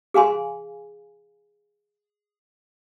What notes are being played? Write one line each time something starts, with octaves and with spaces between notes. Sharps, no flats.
G#4 F5 G#5 C6